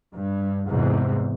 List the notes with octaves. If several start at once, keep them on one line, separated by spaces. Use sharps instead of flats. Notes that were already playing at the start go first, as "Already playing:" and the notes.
G2
E2 G#2 C3